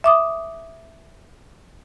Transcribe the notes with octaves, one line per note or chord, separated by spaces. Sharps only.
E5 D6 D#6